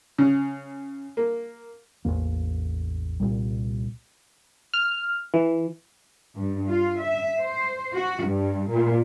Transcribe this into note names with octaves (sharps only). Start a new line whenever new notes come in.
C#3
A#3
A1 E2 B2 A#3
C2 A#2 G3
F6
E3
G2
F4
E5
C5
F#4
G2
A#2